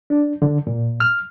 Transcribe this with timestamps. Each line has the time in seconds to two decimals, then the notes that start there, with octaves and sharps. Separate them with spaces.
0.10 D4
0.42 D3
0.67 A#2
1.00 F6